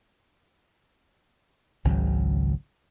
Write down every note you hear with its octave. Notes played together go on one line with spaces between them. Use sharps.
G#1 C#2 C#3 F#3